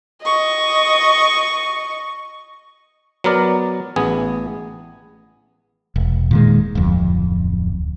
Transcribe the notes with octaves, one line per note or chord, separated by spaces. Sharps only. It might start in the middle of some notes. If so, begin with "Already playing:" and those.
D#5 C#6
F#3 B3 A#4 D5
A1 B3 G#4 G#5
E1
A#2 D#3 G#3
D1 F2